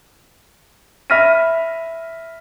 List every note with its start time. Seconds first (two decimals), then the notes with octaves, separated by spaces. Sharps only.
1.10 E5 B5 F6 A#6 B6 D#7